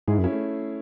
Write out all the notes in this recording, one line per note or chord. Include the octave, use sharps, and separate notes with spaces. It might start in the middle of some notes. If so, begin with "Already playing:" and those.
G#2 E4 G#4
F#2
C#4 E4
A3